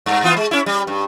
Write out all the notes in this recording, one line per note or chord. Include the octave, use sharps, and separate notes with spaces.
G2
E3 B3 F4
G#3
C#4 E4
G3
G2